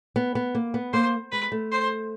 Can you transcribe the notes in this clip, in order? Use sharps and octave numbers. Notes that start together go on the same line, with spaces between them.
B3
B3
A#3
B3
A#3 C5
G#3 B4
A3
C5